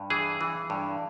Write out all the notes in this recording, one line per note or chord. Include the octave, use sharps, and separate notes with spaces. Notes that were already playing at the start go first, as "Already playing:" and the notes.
Already playing: G2
E3 G#4
E3
G2